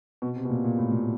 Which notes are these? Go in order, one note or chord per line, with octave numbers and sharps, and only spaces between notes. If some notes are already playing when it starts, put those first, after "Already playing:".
B2
C3
B2
A#2
A#2
A2
A#2